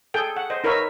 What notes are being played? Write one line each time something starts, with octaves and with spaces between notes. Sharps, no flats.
G#4 A4 G5
F#5
C5 D#5
D#4 A#4 B4 C#5 E5